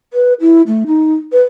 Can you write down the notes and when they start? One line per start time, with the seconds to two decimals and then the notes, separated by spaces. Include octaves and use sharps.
0.14 B4
0.41 E4
0.67 A3
0.87 D#4
1.32 B4